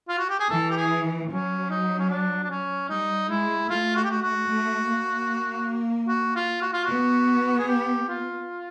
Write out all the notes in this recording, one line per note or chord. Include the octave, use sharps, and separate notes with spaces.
F4
F#4
G4
G#4
E3 A4
G4
G#4
F#3 C#4
D#4
C#4
D4
D4
C#4
G3 D#4
G#3 E4
A3 F4
F#4
G4
F#4
F#4
A3
A#3
F#4
F4
F#4
F4
B3 F#4
G#4
G4
F4